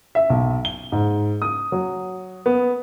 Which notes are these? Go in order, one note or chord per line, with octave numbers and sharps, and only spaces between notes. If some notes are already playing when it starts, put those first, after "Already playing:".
E5
B1
G7
G#2
D#6
F#3
B3